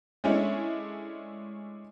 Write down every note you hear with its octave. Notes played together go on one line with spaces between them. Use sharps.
G#3 A3 C#4 D4 E4